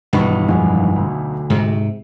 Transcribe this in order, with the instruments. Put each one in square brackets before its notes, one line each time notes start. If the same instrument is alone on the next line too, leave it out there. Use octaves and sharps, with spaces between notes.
[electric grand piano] B1 [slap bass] G2 D#3 E3 [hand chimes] F#5 B5 C#6
[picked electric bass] F2 F3 G#3 [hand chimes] F#5 G#5 B5
[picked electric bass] D2
[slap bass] G#2 C3